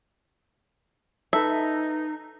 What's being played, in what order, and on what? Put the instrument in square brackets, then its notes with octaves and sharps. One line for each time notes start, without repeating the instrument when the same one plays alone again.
[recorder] D#4 [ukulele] A4 B4 [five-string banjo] E5